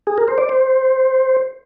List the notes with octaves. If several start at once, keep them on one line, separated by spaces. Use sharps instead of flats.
G#4
A#4
C5
D5
C5